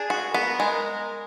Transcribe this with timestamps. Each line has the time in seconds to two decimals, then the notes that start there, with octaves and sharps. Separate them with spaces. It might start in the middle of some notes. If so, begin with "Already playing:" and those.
Already playing: D4 G#4
0.10 F#4
0.34 B3 A#4
0.60 G#3